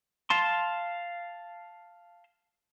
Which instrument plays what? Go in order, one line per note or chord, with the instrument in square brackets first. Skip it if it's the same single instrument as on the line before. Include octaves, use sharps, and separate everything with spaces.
[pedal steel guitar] F5 A5 C6